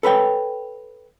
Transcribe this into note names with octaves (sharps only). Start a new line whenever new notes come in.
A4 B4 C#5 G5